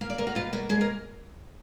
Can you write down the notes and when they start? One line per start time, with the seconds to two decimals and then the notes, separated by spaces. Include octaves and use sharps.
0.01 A#3 F5
0.10 D5
0.18 A#3 A#4
0.27 F#4
0.35 B2 F4
0.53 A#3 F#4
0.69 G#3 G#4
0.81 A#4